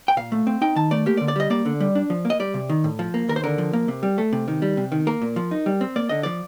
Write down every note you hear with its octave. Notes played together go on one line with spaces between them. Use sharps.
G5
A#2 F5
A3
C4
D#4 G5
D#3 A5
A3 D5
A#3 G4
D5
D3
D5
G3 D#5
A#3 D5
D3
G3
D4
F3
A#3
D#5
G3 D5
C3
D#3
A2
F3
A#3
D#2 A#4
C5
D3 A#4
F3
A#3
C3
G3
A3
C3
D#3
G3
C3
D#3
A#3 A#4
A#2
F3
D#4
G3
C4
A#3 D5
D3 D#5
F3 D5